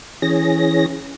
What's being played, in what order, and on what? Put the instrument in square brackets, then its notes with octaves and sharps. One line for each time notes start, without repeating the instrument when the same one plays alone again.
[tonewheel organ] E3 C#4 G#4 A#6